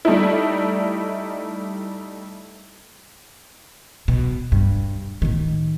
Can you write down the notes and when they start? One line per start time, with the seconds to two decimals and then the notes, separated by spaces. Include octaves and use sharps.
0.05 G3 A3 D#4 E4
4.08 B2
4.52 G2
5.22 A2 D#3